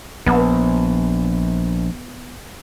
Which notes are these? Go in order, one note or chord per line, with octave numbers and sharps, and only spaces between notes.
A#1 B3